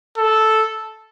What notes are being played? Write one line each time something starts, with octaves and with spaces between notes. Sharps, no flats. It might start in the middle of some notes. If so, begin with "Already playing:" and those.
A4